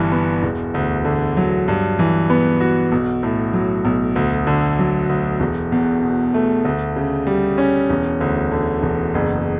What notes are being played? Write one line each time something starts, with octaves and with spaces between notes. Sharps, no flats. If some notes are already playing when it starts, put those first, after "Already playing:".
Already playing: G1 G2 E3
B3
E1
D2
D3
F#3
G2
E3
B3
F#4
B1
A2
F#3
B1
D2
D3
F#3
D2
E1
E2
B2
A3
D2
C#3
G3
C#4
E1
D2
D3
E1
F#1